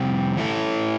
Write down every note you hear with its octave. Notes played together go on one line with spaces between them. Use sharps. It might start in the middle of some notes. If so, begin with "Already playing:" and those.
Already playing: F2 C3 G3 C4 G4
E3 A3 E4 A4